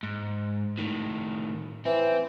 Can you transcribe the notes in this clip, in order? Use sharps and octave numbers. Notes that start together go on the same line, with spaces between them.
G#2
A2 D#3
E3 C4